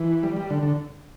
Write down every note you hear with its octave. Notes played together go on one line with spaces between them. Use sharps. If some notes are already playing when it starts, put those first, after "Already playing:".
Already playing: E3
G3
G3
D3
D3